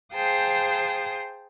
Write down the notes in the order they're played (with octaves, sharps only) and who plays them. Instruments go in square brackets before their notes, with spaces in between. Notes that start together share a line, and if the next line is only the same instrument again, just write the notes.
[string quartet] G#4 C5 F5 G5 A5 D#6